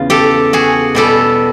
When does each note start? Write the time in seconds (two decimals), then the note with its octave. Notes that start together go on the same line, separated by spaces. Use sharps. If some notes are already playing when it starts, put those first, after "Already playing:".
Already playing: E2 C#3 F4
0.10 G4 A4
0.53 F#4 G#4
0.95 B2 G3 G4 A4